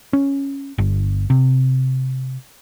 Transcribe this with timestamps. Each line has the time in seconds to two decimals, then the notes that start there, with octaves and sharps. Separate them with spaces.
0.13 C#4
0.78 G1
1.30 C3